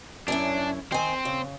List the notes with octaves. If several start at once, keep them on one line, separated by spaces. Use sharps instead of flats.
F#2 C#4 D4 E4
D#3 C4 G#5
C#3